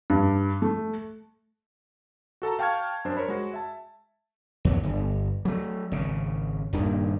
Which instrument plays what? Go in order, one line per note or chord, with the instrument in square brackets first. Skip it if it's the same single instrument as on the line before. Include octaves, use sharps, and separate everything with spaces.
[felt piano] G2
A3
[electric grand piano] F#4 A4 A5 A#5
F5 G5 A5 C#6 F6 G#6
F#2 D4 C5
A#4 C5 C#5 B5
G#3 F#4
E5 A5
[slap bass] D#2 F#3
G1
F#3 A3
G#1 C#3
D#1 G2 A#2 D#3